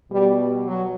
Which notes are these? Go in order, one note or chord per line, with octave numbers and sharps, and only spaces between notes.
B2 G3
F#3